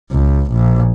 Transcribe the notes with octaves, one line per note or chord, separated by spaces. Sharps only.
C#2
A#1